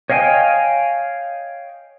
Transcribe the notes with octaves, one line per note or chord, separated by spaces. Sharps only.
C#5 D#5 F5 G5 G#5